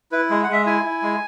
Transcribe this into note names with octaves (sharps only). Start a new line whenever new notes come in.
E4 B4
G#3
F#5
G#3 E5
E4 G#5
E4
G#3